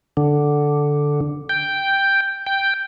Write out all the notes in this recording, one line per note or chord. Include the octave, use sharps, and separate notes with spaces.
D3
G5
G5